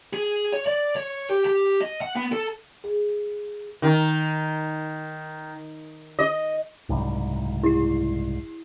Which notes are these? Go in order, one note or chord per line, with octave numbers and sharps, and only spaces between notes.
G#4
C#5
D5
C#5
G4
G4
D#5
F#5
B3
A4
G#4
D#3
D#5
F#1 C2 G#2
E4 C7